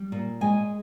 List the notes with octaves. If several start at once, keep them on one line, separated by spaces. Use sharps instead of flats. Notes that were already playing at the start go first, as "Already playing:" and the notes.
Already playing: G3
A#2
G#3 G#5